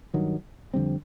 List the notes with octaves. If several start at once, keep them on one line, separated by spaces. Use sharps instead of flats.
G2 D#3 F#3
F2 D3 G3 C4